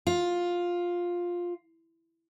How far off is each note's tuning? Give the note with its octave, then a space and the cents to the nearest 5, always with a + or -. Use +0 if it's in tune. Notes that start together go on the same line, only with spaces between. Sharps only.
F4 +10